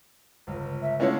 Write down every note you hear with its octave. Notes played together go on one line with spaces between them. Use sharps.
G1 C#2
E5
D3 G#3 A3 C#4 E4 F4 C#5